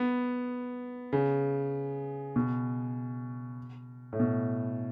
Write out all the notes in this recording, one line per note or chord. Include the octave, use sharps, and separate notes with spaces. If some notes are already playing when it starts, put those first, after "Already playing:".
Already playing: B3
C#3
B2
A2
B2